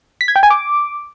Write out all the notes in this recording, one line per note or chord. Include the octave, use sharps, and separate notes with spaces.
B6
G#6
G5
G#5
D6